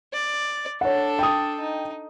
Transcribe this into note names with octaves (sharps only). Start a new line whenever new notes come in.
D5
D4 A4 C#5 F#5
G5 D#6
D#4